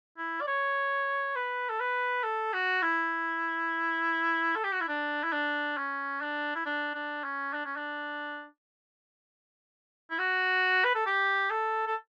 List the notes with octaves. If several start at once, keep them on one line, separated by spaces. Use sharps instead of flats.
E4
D5
C#5
B4
A4
B4
A4
F#4
E4
A4
G4
F#4
E4
D4
E4
D4
C#4
D4
E4
D4
D4
C#4
D4
C#4
D4
E4
F#4
B4
A4
G4
A4
A4